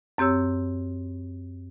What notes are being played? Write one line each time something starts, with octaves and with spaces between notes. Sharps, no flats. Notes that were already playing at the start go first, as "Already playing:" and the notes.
F#2 C4 G4 C#5 E6